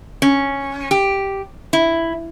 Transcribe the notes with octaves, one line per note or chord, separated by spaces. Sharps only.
C#4
G4
E4